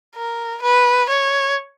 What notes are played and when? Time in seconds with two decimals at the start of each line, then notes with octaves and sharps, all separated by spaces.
0.15 A#4
0.62 B4
1.09 C#5